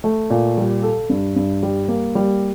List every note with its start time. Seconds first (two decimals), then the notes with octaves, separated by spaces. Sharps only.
0.04 A3
0.30 A#2
0.57 G3
0.83 A4
1.10 G2
1.36 G2
1.63 G3
1.88 A#3
2.15 G3